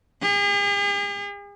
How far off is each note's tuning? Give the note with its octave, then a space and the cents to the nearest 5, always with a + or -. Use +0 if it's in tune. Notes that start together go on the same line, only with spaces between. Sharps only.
G#4 -45